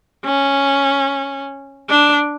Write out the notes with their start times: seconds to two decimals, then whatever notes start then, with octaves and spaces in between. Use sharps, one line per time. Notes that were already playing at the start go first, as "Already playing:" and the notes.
0.26 C#4
1.90 D4